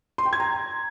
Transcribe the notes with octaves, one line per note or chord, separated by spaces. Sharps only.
C6
G5
G#6
A#5